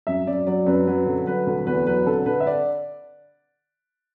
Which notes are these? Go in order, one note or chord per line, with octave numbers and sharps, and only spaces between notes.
F#2 E5
F#2 D5
F#3 D5
F#2 B4
F#3 B4
D3
F#3 B4
D2
E2 B4
F#3 B4
D3 A4
D3 B4
E5
D5